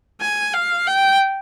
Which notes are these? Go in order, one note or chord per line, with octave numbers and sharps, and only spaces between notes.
G#5
F5
G5